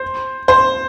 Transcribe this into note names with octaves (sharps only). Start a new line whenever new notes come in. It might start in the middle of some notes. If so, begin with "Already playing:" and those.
Already playing: C5
C5